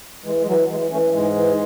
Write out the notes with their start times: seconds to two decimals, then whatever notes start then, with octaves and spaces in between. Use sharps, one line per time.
0.24 E3 G#3
0.40 G#3
0.46 E3 F#3
0.69 E3 G#3
0.91 E3 A3 C#4
1.13 G#2 G#3
1.35 E3